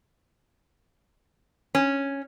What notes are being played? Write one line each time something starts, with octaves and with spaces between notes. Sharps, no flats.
C#4